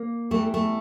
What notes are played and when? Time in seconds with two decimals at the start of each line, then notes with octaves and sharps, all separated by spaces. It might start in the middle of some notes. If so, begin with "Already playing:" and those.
Already playing: A#3
0.31 E2 E3 G3 A3
0.54 A3